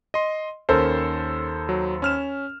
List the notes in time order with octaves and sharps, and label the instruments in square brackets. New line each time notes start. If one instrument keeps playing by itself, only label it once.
[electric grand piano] D#5 C6
[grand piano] D#2 A4 C5 [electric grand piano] C#4 A#4
[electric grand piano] F#3
C#4 F6 E7